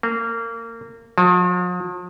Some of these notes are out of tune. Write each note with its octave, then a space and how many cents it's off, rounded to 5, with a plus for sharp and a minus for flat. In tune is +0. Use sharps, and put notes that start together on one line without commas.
A#3 -25
F3 +45